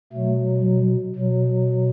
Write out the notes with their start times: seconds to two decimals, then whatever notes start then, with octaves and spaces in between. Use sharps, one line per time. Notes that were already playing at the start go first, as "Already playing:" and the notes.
0.12 B2 F#3 A3
0.64 F#3
1.15 B2 F#3